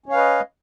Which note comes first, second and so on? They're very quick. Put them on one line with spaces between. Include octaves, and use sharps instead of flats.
C#4 C#5 F5 B4 D#5